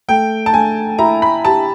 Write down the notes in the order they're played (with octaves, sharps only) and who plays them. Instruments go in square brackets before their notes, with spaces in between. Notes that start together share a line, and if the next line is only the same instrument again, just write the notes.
[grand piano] A3 [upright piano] G5
[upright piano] A5
[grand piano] A3 [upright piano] G#5
[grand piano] E4 [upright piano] A#5
[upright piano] B5
[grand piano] G4 [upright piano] A5